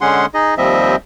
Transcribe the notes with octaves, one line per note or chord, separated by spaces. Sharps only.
D3 G#3 C#4 G#4 F#5 C6
D#4 G#4 D#5
D#2 F3 G3 C4 D#5 E5